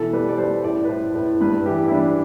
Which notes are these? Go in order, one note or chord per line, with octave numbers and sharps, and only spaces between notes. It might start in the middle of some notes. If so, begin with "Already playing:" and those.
Already playing: B2 E3 A4
G3 B4
D5
G3 C5
A2 D5
B4
A2 C5
A2 B4
G2 B4
E3 G4
E4
E3 D4